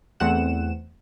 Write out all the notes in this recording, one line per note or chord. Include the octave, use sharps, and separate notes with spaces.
E2 A3 C4 F#5 E7